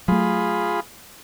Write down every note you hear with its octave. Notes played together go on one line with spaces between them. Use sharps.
F#3 A3 F4 G#4 B5